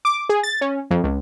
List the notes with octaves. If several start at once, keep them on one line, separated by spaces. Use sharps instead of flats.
D6
G#4
A6
C#4
F2
C#2